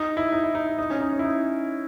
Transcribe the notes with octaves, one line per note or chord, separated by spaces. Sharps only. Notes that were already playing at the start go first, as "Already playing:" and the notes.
Already playing: D#4
E4
D#4
E4
D#4
E4
D#4
C#4
D#4
C#4
E4
D#4